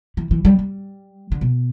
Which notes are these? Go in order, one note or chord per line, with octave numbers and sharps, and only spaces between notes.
E3
E3
G3
G3
D3
B2